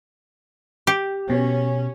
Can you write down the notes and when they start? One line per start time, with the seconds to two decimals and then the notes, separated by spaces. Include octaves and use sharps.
0.87 G4
1.30 B2 C#4